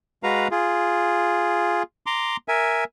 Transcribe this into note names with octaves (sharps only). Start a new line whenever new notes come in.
G#3 F#4 B4 F5 A#5
F4 G#4
A#5 C6 D6
A#4 E5 G#5